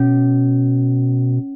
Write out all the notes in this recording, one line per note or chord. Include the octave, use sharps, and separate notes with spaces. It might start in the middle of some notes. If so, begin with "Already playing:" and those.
Already playing: B2 C#4